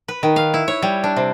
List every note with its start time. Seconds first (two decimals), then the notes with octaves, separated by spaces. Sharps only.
0.08 B4
0.23 D#3
0.36 F5
0.54 E4
0.68 C#5
0.82 G3
1.04 D4
1.16 C3